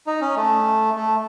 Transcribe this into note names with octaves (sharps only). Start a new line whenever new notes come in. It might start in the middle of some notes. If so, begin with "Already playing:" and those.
D#4
C#4
A3
A3